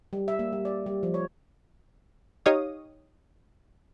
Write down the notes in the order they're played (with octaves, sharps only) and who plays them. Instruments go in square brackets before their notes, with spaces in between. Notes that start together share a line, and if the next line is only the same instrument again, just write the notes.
[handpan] G3
E5
A#3
G3
D5
G3
F3
C#5
[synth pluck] D#4 G4 C#5 D#5 F5 D#6